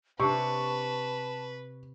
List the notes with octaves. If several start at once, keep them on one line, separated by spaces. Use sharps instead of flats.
C3 D4 B4 A5 C#6